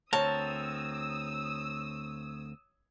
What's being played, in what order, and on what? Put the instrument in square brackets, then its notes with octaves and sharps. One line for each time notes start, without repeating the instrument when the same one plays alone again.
[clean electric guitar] D2 C4 A#4 [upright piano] C#5 [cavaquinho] A5 [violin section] D#6 E6